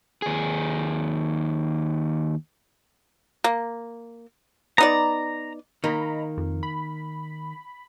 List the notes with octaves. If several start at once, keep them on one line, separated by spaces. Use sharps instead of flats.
D#2 G#4
A#3
B3 D#4 D5 A#5
D#3 A#3 D#5 A#5 B5
F2
B5